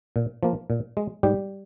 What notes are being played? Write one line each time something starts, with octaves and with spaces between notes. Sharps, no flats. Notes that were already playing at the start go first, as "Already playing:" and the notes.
A#2
F3 A#3
A#2
G#3
G#2 G3 G4